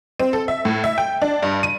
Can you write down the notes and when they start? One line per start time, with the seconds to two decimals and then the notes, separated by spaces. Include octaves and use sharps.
0.20 C4
0.33 A4
0.48 E5
0.65 A2
0.84 E5
0.98 G5
1.22 D4
1.43 G2
1.63 D#7